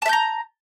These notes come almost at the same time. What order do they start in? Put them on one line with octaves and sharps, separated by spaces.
A5 E5 G6 A#5